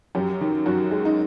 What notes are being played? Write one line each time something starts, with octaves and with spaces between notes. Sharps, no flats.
F#2 G4
D#3
F#2 F#4
G#3
D#4